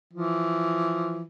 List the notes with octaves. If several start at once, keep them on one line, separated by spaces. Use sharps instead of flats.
E3 F3